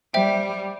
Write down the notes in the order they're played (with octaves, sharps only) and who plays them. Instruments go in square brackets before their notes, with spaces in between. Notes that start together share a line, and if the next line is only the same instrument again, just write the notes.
[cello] G3 [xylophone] C5 E5 G5